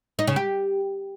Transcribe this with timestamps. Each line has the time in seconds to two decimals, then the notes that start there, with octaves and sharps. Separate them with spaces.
0.19 D#4
0.27 C#3
0.36 G4